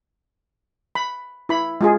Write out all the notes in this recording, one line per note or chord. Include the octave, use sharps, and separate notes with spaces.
B5
E4 B5
G#3 F4 G#4